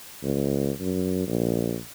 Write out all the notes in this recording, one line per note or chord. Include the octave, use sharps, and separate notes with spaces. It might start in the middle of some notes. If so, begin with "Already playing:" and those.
C#2
F#2
A#1